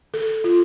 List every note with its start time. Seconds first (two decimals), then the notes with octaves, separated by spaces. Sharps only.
0.14 A4
0.44 F4